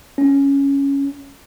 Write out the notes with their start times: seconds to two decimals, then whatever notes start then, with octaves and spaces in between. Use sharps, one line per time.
0.18 C#4